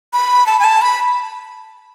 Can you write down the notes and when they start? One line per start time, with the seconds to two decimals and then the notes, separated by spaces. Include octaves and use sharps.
0.13 B5
0.46 A5
0.60 G#5
0.64 A5
0.82 B5